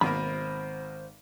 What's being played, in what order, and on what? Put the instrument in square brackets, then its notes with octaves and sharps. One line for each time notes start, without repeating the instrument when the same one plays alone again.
[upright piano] G#1 [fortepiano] B2 A#3 [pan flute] C5 [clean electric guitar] B5